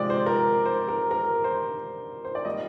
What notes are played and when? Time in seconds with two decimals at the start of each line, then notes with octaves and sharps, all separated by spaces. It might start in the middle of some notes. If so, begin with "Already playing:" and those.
Already playing: C3 F3 G#3 C4 D5
0.10 C5
0.26 A#4
0.66 C5
0.89 A#4
1.11 A#4
1.44 C5
2.25 C5
2.35 D5
2.45 A#2 G3 D#5